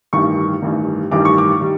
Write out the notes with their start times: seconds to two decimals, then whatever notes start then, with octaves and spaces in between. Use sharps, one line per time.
0.13 A1 G2 D#3 G3 C#6
0.62 A1 G2 D#3 G3
1.11 A1 G2 D#3 G3 D6
1.25 C#6
1.38 D6
1.61 D#3 G3